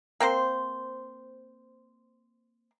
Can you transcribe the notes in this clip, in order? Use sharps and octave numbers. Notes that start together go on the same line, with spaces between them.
A#3 C4 C5